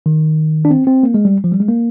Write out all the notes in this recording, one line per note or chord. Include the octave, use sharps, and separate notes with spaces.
D#3
D4
C4
C4
A#3
G#3
G3
F3
G3
G#3
A#3